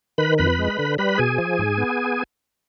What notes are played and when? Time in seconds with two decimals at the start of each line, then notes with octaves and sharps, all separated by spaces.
0.18 D#3 B4 B5
0.38 F2 B4 B5
0.59 G#3
0.79 D3
0.98 G3 B4 B5
1.18 B2 G#4 G#5
1.38 F3
1.58 G#2
1.78 B3